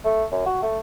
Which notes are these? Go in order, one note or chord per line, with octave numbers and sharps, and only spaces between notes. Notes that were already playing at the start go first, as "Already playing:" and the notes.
A3
F#2
F#4
A3